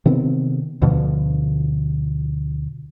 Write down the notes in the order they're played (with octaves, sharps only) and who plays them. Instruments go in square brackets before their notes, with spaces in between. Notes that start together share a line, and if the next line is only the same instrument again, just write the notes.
[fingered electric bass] C3 D#3 B3 C4
D2 B2 D3 F3